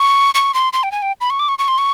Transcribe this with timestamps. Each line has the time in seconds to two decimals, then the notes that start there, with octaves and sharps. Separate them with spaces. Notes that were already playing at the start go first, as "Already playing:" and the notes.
Already playing: C#6
0.35 C#6
0.54 C6
0.73 C6
0.83 G5
0.92 G#5
1.02 G5
1.21 B5
1.30 C#6
1.39 D6
1.48 C#6
1.59 C#6
1.68 C6
1.78 C#6